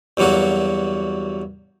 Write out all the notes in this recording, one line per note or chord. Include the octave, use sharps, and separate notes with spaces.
E2 G2 F#3 A#3 F#4